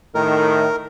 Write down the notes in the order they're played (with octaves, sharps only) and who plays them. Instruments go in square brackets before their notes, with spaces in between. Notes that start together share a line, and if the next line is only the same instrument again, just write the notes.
[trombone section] A2 D#3 [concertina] A#4